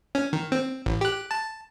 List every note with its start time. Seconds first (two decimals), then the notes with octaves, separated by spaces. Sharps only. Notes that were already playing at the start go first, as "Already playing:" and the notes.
0.15 C#4
0.33 D#3
0.52 C4
0.86 A1
1.01 G4 F#6
1.31 A5